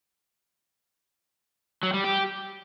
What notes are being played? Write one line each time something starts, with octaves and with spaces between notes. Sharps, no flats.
F#3
G3
G4